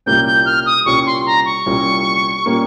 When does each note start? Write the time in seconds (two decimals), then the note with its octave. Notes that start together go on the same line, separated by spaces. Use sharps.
0.06 C2 A#2 G3 A#3 C#4 G6
0.26 G6
0.46 F6
0.66 D#6
0.86 C2 A#2 G3 A#3 C#4 C#6
1.06 C6
1.26 A#5
1.46 C#6
1.66 C2 A#2 G3 A#3 C#4
2.46 A#2 G3 A#3 C#4